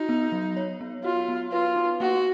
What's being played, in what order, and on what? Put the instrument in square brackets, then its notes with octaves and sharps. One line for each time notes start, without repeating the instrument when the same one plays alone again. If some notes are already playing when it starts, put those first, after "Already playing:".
Already playing: [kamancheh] D#4 [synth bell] F#4
[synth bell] B3
F#3
C#5
B3
[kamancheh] F4 [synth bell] F#4
[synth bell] B3
[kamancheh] F4 [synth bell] B4
[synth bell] D#4
[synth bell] A#3 [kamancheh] F#4